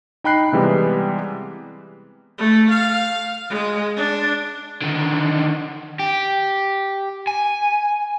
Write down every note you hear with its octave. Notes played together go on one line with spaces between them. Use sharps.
D#4 G5 B5 F#6 C7
C3 E3 G3 G#3 B3
A3
F5
G#3
D4
D3 D#3
G4
G#5